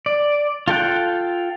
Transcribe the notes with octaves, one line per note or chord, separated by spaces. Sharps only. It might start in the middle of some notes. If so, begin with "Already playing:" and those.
D5
F4 A4 G5 F#6